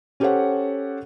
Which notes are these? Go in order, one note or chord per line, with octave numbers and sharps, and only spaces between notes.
C#4 G4 A4 C5 C#5 F#5